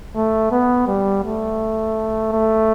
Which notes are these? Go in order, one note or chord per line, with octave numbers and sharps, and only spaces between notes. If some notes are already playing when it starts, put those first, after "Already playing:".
A3
B3
G3
A3
A3